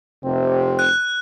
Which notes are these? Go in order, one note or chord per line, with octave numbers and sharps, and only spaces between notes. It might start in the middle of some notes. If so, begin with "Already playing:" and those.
F1 C3 C4
F#6